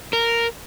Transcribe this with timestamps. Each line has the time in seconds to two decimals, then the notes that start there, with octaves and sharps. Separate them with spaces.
0.13 A#4